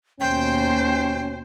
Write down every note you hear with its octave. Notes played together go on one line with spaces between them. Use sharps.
D#2 B2 C#4 C5 G5